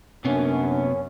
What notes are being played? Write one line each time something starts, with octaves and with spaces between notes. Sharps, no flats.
F#2 C3 A#3 B3 C#4 D4